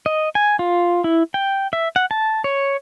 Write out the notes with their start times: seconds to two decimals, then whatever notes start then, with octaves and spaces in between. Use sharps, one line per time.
0.06 D#5
0.35 G#5
0.59 F4
1.04 E4
1.34 G5
1.73 E5
1.96 F#5
2.11 A5
2.44 C#5